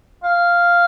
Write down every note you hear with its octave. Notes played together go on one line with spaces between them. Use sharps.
F5